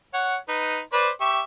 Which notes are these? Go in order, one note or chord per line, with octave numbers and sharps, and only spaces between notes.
C#5 F#5
D#4 B4
B4 C5 D5
G4 E5 C#6